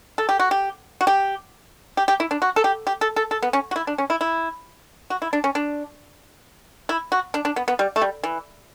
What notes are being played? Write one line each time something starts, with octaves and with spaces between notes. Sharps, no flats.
A4
G4
F#4
G4
F#4
G4
G4
G4
E4
D4
F#4
A4
G4
G4
A4
A4
A4
B3
C#4
F#4
E4
D4
C#4
E4
E4
F#4
E4
D4
C#4
D4
E4
F#4
D4
D4
B3
B3
G3
A3
G3
E3